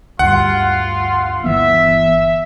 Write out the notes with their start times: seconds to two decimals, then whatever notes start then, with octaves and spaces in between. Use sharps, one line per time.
0.19 D2 G2 F4 F5 F#5 C6
1.44 G1 E3 B3 E5